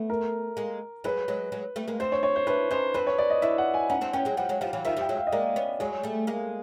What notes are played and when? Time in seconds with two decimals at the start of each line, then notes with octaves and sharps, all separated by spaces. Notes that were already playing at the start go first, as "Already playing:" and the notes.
Already playing: A3 B3
0.10 A#4
0.57 G#3 A#3
1.04 F#3 G#3 B4
1.28 F#3 G#3
1.52 F#3 G#3
1.76 G3 A3
1.88 G#3 A#3
2.00 C4 D4 C5
2.12 C#5
2.23 C#5
2.36 C5
2.47 D4 E4 B4
2.71 C#4 D#4 C5
2.94 C4 D4 B4
3.07 C#5
3.18 D5
3.30 D#5
3.42 D4 E4 E5
3.58 F#5
3.74 G#5
3.90 C#4 D#4 F#5
4.01 C4 D4
4.13 B3 C#4 G5
4.25 F#3 G#3
4.37 F3 G3 F#5
4.49 F#3 G#3
4.61 F3 G3 F5
4.73 E3 F#3
4.85 D#3 F3 E5
4.97 F3 G3 G5
5.09 F#3 G#3
5.17 F5
5.27 D#5
5.32 G#3 A#3 D5
5.56 B3 C#4
5.80 F#3 G#3 G#4
6.03 G3 A3
6.27 G#3 A#3